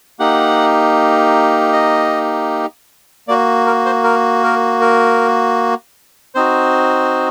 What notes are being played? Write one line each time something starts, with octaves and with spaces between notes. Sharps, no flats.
A#3 D#4 G4 F#5
D#5
A#3 F#4 D5
A#4
C5
A#4
A#4
A#4
C4 D#4 F#4 C5